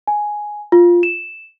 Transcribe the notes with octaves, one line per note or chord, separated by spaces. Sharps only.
G#5
F4
E7